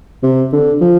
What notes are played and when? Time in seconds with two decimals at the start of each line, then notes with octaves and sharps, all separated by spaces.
0.23 C3
0.53 D3
0.81 F3